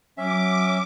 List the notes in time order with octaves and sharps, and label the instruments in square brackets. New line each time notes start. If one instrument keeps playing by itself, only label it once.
[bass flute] F#3 [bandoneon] C#4 [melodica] E5 [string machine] D6